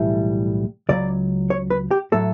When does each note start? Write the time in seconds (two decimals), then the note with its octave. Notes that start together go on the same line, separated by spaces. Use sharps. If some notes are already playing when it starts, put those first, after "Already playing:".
Already playing: B1 A2 E3 G3
0.89 C#2 C#3 F#3 D5
1.50 C#5
1.70 B4
1.91 G4
2.12 A2 F#3 A3 A4